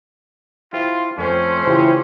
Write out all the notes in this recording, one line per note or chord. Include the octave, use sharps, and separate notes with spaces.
E4 F4 G4 C5
F2 A3 C#4 A4 C5 G5
C#3 E3 E4 F4 G4 G5